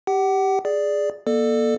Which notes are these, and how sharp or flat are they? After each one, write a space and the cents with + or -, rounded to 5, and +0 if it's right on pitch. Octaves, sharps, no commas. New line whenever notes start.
G4 +0 F#5 +35
G#4 +0 D5 +0
A#3 +35 A4 +0 D5 +35